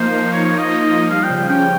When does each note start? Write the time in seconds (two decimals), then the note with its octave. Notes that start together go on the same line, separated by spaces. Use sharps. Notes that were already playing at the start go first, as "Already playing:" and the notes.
Already playing: F3 A#3 D#4 C5
0.13 F3
0.32 A#3 C#5
0.45 C#5
0.52 F3
0.58 D#5
0.71 D#4
0.91 F3
1.10 G3 F5
1.24 G5
1.30 C#3
1.37 G5
1.49 C#4 G5